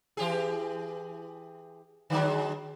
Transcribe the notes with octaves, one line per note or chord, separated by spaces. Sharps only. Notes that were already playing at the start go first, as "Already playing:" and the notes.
E3 G4 G#4
D3 F#3 G#3